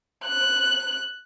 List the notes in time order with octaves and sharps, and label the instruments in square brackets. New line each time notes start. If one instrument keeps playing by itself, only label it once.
[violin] F#6